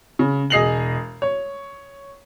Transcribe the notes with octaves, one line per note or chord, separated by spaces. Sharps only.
C#3
E1 G#4 D#5 C7 F7 F#7
C#5